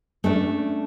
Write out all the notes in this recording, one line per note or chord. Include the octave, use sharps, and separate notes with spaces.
A3 C#4 D4